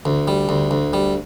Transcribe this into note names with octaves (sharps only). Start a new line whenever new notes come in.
D2
G3
D2
D2
G3